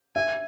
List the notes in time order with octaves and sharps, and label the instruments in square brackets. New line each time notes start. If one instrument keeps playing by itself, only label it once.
[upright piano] E5 [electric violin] G#5